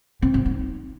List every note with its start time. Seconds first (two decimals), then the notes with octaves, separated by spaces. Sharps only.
0.22 C4
0.34 F3
0.46 D#4